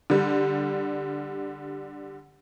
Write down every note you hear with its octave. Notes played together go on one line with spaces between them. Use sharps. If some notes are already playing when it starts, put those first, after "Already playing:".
D3 G3